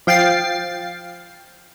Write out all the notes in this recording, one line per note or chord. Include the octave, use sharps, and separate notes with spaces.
F3 F5 G5 A6 C7